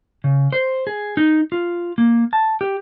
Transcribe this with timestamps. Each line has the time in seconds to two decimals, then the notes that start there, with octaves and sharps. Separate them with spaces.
0.24 C#3
0.53 C5
0.87 G#4
1.17 D#4
1.52 F4
1.98 A#3
2.33 A5
2.61 G4